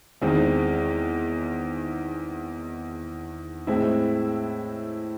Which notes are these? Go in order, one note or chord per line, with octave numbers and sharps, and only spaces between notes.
E2 D#3 G#3 C4
A2 G#3 C4 E4